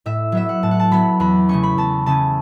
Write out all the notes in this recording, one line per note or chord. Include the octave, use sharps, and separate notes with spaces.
A2 E5
F#3 B3 E5
F#5
A2 A5
F#5
A5
F#3 B3 B5
E2 B5
C#3 A3 C#4 C#6
B5
E2 A5
C#3 A3 C#4 A5